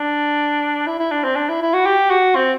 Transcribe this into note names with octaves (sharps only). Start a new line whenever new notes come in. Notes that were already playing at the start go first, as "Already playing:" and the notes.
Already playing: D4
E4
E4
D4
C4
D4
E4
E4
F#4
G4
F#4
C4